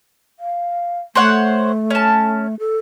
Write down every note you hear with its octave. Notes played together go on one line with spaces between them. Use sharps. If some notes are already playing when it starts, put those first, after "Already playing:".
F5
A3 C5 C#5 F#5
C#4 A5
A4